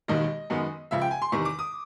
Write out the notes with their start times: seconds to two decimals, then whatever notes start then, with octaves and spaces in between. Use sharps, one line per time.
0.08 E1 D#2 D#3 D#5
0.50 F#2 D#3 G#3 B3
0.91 C#2 C#3 F3 E5
1.01 G5
1.11 G#5
1.22 C6
1.32 E2 C3 D#3 C#6
1.45 D6
1.59 D#6